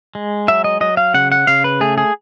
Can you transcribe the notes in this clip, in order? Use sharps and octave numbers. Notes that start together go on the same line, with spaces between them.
G#3
F#3 E5
D#5
F#3 D#5
F5
C#3 F#5
F#5
C#3 F5
B4
A3 G#4
G#4